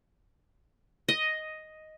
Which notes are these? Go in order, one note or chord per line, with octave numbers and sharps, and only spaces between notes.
D#5